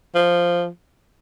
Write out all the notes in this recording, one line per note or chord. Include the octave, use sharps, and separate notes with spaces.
F3